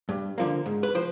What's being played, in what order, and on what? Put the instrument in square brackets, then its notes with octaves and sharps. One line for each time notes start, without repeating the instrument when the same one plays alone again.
[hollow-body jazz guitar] G2
D3 F3 A#3
G#2
B4
F3 C5